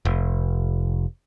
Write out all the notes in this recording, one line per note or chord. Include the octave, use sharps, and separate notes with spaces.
F1